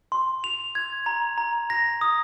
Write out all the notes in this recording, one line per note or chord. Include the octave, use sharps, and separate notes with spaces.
C6
F7
G#6
A#5
A#5
A#6
D#6